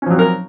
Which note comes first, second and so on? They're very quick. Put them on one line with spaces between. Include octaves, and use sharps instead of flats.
C#4 F3 F#3 C4 A#4